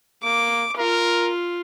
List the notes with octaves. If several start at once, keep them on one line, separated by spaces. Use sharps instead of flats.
A#3 D6
F4 A#4